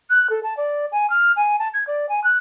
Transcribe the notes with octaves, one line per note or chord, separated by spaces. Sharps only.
F#6
A4
A5
D5
G#5
F6
G#5
A5
G#6
D5
G#5
F#6